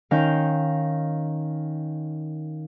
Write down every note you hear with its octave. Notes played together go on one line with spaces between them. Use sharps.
D#3 C#4 F5 F6 G6